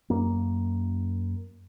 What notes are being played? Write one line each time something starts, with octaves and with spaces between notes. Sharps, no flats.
F#2 A#3